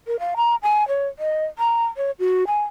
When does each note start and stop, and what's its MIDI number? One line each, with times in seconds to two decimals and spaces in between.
0.07 0.19 70
0.20 0.34 77
0.37 0.55 82
0.63 0.87 80
0.88 1.07 73
1.19 1.45 75
1.59 1.85 82
1.97 2.11 73
2.19 2.44 66
2.47 2.63 80